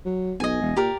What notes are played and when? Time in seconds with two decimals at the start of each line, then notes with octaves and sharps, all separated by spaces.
0.05 F#3
0.40 B1 D#5 G#5
0.61 E1
0.77 A#2 G4 A#4 D5